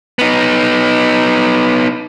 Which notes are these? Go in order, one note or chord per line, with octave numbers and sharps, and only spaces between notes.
B3 D#4